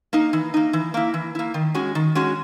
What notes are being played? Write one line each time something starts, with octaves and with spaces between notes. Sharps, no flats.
A#3 D#4
E3
A#3 D#4
E3
A#3 E4
E3
A#3 E4
D#3
G#3 C#4 F#4
D#3
G#3 C#4 F#4